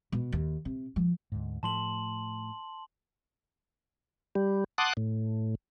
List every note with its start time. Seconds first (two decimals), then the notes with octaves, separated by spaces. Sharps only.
0.12 B2
0.32 D#2
0.65 C3
0.96 F3
1.32 D2 G#2
1.63 A2 F3 A3 A5 C6 F#7
4.35 G3
4.78 F#5 A5 C6 D6 D#6 F#6
4.97 A2